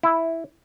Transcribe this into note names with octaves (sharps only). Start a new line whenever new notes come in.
E4